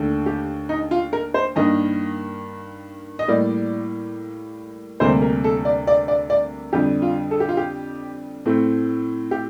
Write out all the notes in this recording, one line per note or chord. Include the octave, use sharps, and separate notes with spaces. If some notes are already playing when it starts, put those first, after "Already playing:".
Already playing: D#2 D3 A3
G4
D#4
F4
A#4
C5
G2 D#3 A#3 D#5
D#5
A2 G3 A#3 D5
D2 C3 G3 A#3 C5
A#4
A4
D5
D5
D5
D5
F2 D3 G3 G4
F4
A4
G4
F4
G4
A2 A3 C4
G4